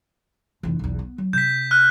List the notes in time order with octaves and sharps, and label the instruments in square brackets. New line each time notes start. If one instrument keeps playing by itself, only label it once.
[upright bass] F1 E3
B1 E2
B3
F#3
[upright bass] C3 [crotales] G6 B6
[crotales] F6 F#6